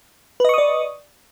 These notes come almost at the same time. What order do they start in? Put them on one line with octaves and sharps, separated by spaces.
B4 D#5 C#6 D#6 D5